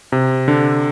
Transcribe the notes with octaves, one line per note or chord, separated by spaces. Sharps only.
C3
D3